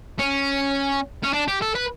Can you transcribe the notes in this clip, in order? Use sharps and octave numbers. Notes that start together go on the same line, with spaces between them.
C#4
C#4
D4
G4
A4
B4